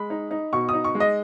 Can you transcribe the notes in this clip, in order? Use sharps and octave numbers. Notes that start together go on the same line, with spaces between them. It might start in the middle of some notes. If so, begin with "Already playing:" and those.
Already playing: G#3 B5
D#4
D#4
B2 C#6
D#4 D#6
C#6
G#3
D#5